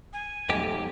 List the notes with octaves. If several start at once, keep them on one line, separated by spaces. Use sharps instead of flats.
G#5
B1 F2 G#2 A3 G4